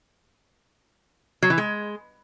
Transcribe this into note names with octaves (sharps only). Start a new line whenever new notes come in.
F#3
E3
G#3